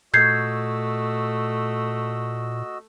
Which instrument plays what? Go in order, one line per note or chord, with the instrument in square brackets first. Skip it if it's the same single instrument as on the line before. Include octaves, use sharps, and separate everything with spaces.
[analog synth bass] A#2 [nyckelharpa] A3 [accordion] F#4 D#5 E6 [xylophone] G6 G#6 C7